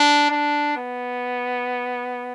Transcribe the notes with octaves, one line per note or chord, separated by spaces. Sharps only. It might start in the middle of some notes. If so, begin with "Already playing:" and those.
Already playing: D4
D4
B3